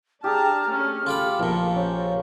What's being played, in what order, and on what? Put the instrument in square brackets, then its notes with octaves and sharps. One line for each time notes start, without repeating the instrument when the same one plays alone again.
[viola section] D4 A5 A#5 [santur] G4 G#4 [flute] F6
[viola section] A3 C#4
[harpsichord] F4 G4 B5 [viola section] A4
[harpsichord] A#1 A#2 [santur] F3 F4 A#5
[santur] C#4 [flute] C5